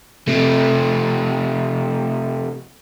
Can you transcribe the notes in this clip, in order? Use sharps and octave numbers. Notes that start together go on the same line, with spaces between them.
C3 A3